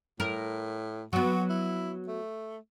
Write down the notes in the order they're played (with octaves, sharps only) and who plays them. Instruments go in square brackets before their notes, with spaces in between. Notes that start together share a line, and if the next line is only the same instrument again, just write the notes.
[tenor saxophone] A2 [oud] A#4
[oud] F#3 B3 [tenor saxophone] F#4
[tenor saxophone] E4
A3